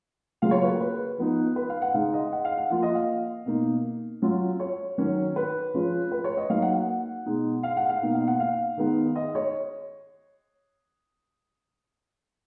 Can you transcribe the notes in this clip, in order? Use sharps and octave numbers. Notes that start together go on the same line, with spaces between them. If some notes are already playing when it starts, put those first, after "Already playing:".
C#3 F#3 A#3 F4 F5
C#5
B4
A#4
B4
F3 B3 D#4
B4
F5
F#5
C#3 G#3 D#4 F5
D#5
F#5
F5
F#5
F3 A#3 F4 F#5
D#5
F5
B2 A#3 D#4
F#3 C#4 F4
C#5
D#3 F#3 C#4
B4
F3 G#3 C#4 F4
B4
C#5
D#5
F#3 A#3 D#4 F5
F#5
F#5
B2 G#3 D#4
F5
F#5
F5
B2 A#3 D#4
F5
F#5
F5
D#3 G#3 B3 D#4
D#5
C#5